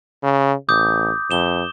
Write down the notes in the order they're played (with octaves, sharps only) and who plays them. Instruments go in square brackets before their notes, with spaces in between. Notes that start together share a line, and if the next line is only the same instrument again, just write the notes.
[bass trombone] C#3
[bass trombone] A1 [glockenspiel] D6 D#6 G6
[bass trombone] F2 [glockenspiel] E7 G7